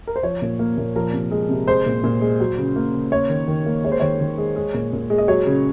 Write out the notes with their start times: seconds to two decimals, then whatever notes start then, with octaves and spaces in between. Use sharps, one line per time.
0.07 A#4
0.16 C5
0.23 F3 C#5
0.42 A#2
0.59 A#3
0.77 A#2
0.96 F3 A#4
1.13 C3
1.31 G#3
1.49 C3
1.67 G#3 C5
1.86 A#2
2.04 A#2
2.21 G#3
2.40 F#3
2.58 C#3
2.76 A#3
2.93 C#3
3.12 A#3 C#5
3.30 D#3
3.48 D#3
3.66 A#3
3.84 G#3 C#5
3.92 C5
4.00 D#3 C#5
4.21 D#3
4.38 G#3
4.56 G#3
4.74 A#2
4.93 A#2
5.10 G#3
5.18 D#5
5.28 F#3 C#5
5.46 C#3